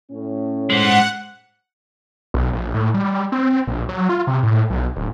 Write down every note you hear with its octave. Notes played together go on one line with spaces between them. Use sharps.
A2 C#4
G#3 C5 F#5
B1
A#1
A2
G3
C4
A#1
F#3
F4
C3
A2
B1
D1